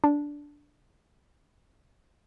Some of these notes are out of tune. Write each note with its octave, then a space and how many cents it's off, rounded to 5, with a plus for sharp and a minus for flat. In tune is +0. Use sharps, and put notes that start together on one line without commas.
D4 -5